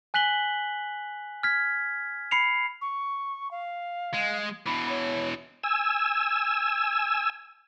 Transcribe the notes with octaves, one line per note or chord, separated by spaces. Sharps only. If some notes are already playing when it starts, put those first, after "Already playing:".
G#5 F#6 B6 F#7 G7
F6 G#6 B6
B5 C7 C#7 F7
C#6
F5
G#3
B2 E3 B5
C#5
G#5 E6